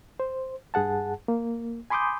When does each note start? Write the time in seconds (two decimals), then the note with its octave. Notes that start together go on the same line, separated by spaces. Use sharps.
0.20 C5
0.74 G2 G#4 F#5 A5
1.28 A#3
1.90 G#5 B5 C6 D6 D#6 G6